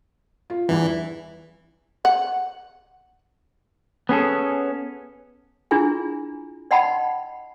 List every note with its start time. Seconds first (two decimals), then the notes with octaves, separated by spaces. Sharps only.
0.50 F4
0.69 E2 G2 E3
2.05 F#5
4.09 B3 C#4 G#4 A4
5.71 D4 E4 F4 G#4 G#5
6.71 D5 D#5 F#5 G5 A5 B5